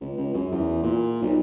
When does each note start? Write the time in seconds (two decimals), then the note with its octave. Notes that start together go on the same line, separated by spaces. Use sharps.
0.01 C#2
0.18 C#2
0.34 F#2
0.52 E2
0.83 A#2
1.22 B1